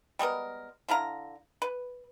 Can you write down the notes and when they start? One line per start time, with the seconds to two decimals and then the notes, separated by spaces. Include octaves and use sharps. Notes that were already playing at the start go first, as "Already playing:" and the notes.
0.19 G3 G#3 B3 A#4
0.89 D3 E4 F5 A#5
1.62 B4